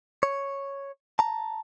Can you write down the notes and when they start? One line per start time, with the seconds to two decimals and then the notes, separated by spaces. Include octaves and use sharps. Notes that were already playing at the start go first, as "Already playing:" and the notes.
0.23 C#5
1.19 A5 A#5